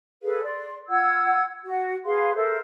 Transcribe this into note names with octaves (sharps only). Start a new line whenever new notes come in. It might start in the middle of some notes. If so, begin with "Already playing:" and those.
G#4 A4 B4 F5
D5 C6
F4 F#5 E6 G#6
F#4
G#4 B4 F5 C6
A4 A#4 C5 E5